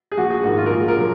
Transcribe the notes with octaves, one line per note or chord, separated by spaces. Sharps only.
G#4
A#1 F#4
G#4
G#2 D#3 F#4
F4
A#4
A#1 G#4
A#4
A#2 F#3